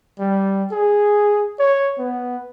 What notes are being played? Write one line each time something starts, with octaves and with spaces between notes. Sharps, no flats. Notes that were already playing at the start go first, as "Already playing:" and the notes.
G3
G#4
C#5
B3